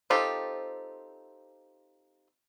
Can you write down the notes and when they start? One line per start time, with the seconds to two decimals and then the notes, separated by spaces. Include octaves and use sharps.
0.10 C4 D#4 F4 G4 A4